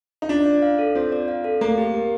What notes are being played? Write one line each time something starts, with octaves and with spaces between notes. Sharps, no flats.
D#4
D4 F4
D5
F5
A4
C4 F4
D5
F5
A4
A3 A#3
G4
A#4